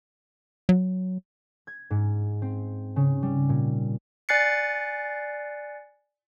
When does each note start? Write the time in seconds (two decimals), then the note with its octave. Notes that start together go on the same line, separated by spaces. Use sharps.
0.69 F#3
1.67 G#6
1.91 G#2
2.42 C4
2.96 C#3
3.22 G3
3.49 A#2
4.29 D5 G#5 F#6 A6 C7 C#7